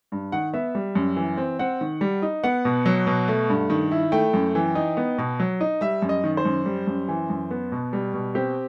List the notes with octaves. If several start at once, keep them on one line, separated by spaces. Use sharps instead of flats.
G2
D#3 F#5
B3 E5
G3
F#2
E3
C4
C4 F#5
D#3
G3
D#4
B3 F#5
B2
F#3
B2
A3
G2
D#3
E4
A3 G5
F#2
E3
D#4
B3
B2
F#3
D#4
G3 E5
F#2
D#5
D#3
C5
F#2
G3
F#2
E3
F#2
B3
B2
G3
B2
C4 G4